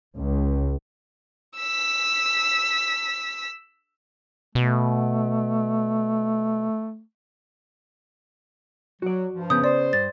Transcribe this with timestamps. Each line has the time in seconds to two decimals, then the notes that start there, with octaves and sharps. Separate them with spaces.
0.17 C#2
1.57 E6 B6
4.55 B2 A3
9.02 F#3 F#4 D5
9.33 G2 F3
9.50 C#3 B3 D#6 G6
9.64 C5 D5
9.93 G2 A6